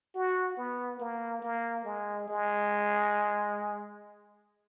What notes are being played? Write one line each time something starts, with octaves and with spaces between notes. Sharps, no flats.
F#4
B3
A#3
A#3
G#3
G#3